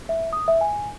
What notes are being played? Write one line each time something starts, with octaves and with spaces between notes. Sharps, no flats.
E5
D#6
E5
G#5